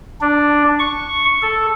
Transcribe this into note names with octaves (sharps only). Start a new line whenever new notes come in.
D4
C#6
A4